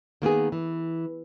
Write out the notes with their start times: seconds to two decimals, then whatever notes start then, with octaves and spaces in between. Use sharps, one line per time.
0.22 D#3 A#3 B3 G#4
0.52 E3